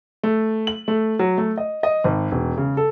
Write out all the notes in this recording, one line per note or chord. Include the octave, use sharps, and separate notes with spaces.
A3
F#7
A3
F#3
A3
D#5
D#5
G#1
E1
C#3
A4